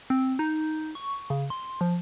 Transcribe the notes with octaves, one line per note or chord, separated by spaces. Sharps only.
C4
D#4
C#6
C#3
C6
F3